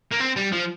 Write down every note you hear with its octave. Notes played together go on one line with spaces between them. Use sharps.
A#3
C4
G3
F3